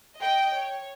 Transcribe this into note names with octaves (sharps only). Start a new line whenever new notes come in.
D#5 G5
C#5